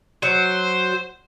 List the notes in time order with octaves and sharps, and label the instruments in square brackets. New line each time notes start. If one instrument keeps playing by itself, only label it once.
[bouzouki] F#3 [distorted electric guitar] C5